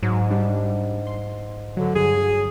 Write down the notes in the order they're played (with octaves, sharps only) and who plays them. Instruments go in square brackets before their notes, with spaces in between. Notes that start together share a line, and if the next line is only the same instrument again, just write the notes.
[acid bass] G#2 [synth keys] F#3
[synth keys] G3 D4
C6
[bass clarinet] D3 [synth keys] F#3
[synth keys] G2 F#3 G#5 [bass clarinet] G#4